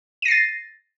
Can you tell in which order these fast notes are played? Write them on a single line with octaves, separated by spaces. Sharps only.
D#7 A#6 C7 A6